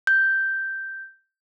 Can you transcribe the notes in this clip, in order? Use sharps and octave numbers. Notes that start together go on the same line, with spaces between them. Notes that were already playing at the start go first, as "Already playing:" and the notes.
G6